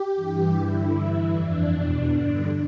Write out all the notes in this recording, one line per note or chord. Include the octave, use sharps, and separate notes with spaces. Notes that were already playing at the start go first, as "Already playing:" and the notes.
Already playing: G4
G2 E3
G2 D3 E4
G2 E3
F2 E3 D4
E2 B2
G2 D3 D4